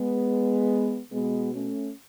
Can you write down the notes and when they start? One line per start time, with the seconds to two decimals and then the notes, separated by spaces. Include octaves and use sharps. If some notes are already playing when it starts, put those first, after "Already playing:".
Already playing: G#3 B3
1.11 B2 G#3 B3
1.53 A3 C#4